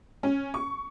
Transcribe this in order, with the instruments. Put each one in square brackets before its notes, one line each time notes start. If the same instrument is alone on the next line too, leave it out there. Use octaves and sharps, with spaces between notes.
[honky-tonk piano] C#4
C#6